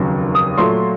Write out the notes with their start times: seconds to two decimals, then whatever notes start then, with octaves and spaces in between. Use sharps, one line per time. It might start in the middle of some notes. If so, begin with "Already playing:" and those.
Already playing: F1 D#2 C#3 F#3
0.35 D#6
0.58 A#2 F#3 A3 C6